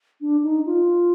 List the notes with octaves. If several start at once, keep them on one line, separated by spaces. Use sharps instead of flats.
D4
D#4
F4